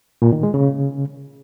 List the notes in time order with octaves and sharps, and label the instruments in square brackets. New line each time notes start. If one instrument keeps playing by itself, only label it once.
[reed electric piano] A#2
D#3
G#3
C#3